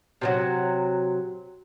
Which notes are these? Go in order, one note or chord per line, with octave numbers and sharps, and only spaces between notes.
C3 F3 F#3